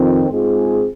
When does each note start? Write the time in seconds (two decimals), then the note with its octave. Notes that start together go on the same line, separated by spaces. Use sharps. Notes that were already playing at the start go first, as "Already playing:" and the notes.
Already playing: F2 D#3 C4
0.30 G#2 G#3 C4 F4 G#4